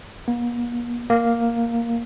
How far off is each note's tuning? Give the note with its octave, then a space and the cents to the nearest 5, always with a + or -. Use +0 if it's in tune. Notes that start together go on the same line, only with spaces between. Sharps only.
A#3 +45
A#3 +0